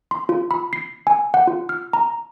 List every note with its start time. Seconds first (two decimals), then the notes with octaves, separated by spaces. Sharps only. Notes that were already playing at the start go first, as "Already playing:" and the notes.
0.11 C6
0.29 F4
0.51 B5
0.73 C7
1.07 G#5
1.34 F#5
1.47 F4
1.69 F6
1.93 A#5